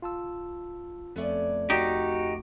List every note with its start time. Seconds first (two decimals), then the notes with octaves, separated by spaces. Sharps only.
0.02 F4 A5 E6
1.16 F2 A3 B3 C#4 D5
1.70 D#4 F#4 G4